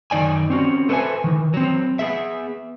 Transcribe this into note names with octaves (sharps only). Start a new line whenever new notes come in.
F#2 D#3 D#4 D5 G#5
C4 C#4 F#4
A3 A4 B4 C5 E5 G#5
D#3 E3
F#3 C4
B3 G#4 E5